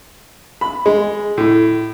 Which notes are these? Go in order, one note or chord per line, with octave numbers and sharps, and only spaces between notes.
B5
G#3
A2